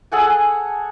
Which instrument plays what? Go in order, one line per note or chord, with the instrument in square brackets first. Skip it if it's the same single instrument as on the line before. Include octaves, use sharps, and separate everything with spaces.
[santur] G#4 A4 F#5 G#5